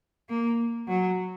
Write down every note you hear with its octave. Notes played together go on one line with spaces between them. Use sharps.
A#3
F#3